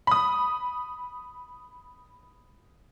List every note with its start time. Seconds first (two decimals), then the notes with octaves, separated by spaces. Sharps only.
0.07 B5 D#6